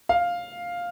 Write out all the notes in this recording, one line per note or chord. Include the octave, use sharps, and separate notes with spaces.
F5